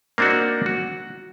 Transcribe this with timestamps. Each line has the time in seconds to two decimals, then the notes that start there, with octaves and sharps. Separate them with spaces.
0.18 A#3 C4 D4 D#4 F#4
0.66 F#4